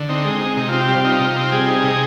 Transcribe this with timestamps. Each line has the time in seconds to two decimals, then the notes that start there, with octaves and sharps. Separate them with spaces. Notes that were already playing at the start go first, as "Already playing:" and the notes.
Already playing: D3
0.09 C4 D#4
0.25 G#3
0.41 D#4
0.57 C3 D#4
0.68 C4 F4
0.80 G4
0.88 G3 F4
1.04 D#4 F4
1.20 C3
1.36 C4
1.52 G3 G#4
1.68 D#4
1.83 C3